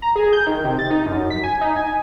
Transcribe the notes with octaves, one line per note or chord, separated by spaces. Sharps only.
A#5
G#4
G6
D#3
C3
A6
D#4
F#2
B6
G#5
D#4
G#5